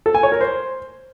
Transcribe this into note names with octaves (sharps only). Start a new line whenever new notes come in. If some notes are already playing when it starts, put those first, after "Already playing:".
A4
G#5
C#5
A#4
C5